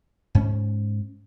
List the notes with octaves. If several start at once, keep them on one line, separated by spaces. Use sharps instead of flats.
G#2 C#4